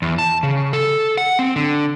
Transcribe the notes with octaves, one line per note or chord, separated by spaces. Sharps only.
E2
A5
C#3
A4
F#5
C4
D3